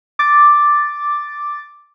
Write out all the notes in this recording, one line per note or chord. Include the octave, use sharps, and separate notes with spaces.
D6 A6